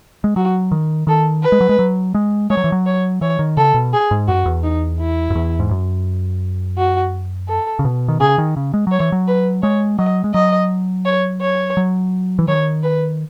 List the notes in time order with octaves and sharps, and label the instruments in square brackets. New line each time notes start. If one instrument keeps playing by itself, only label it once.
[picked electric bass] G#3
[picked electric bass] F#3 [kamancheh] F#4
[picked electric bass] D#3
[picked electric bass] D#3 [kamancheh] A4
[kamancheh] B4
[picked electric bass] G#3
F#3
G#3
F#3
G#3
[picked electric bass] G#3 [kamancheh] C#5
[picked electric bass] F#3
E3
F#3
[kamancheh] C#5
[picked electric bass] E3 [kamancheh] C#5
[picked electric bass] D#3
[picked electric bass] C#3 [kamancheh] A4
[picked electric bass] B2
[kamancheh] G#4
[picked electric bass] G#2
[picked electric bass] F#2 [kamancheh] F#4
[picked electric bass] E2
[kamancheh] D#4
E4
[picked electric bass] F#2
E2
G#2
F#2
[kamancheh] F#4
A4
[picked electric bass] C#3
B2
D#3
[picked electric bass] C#3 [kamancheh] G#4
[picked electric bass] D#3
C#3
G#3
[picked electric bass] F#3 [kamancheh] C#5
[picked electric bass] E3
F#3
[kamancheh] B4
[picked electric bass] G#3 [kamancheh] C#5
[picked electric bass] F#3 [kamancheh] D#5
[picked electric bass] G#3
[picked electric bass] F#3 [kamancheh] D#5
[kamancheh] C#5
C#5
[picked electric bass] F#3
E3
[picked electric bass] D#3 [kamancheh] C#5
[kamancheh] B4